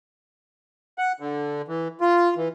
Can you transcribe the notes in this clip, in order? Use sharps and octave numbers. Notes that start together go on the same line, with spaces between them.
F#5
D3
E3
F4
E3